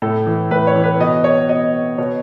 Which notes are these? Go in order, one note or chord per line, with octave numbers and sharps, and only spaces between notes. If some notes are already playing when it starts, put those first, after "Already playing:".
A2 A4
E3
A2 B4
C#5
E3
B4
B2 D#5
C#5
B2 D#5
B2 C#5